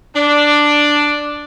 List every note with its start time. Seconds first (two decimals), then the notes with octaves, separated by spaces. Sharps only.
0.15 D4